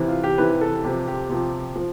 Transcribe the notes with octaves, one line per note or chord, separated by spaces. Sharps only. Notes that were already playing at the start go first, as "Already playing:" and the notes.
Already playing: C3 E3
F4
G4
C3 E3 B4
A4
C3 F3 G4
G4
C3 F3
F3